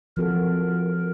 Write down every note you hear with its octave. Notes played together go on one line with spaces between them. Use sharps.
F3 C4 F#4 A4 A#4